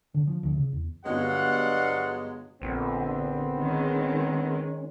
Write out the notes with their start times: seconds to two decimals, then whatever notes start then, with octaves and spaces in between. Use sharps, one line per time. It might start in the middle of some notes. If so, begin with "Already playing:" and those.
0.14 D3
0.27 F3
0.43 D2
0.57 C#3
0.73 E2
1.06 G1 G2 B2 F#3 G#3 D5 F5 F#5
2.62 A#1 D3 B3 C4
3.58 D#3 G#3 C#4